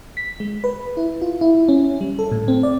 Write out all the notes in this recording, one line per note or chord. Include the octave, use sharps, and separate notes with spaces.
B6
G#3
B4
E4
F4
E4
C#4
G3
A4
A2
C4
D5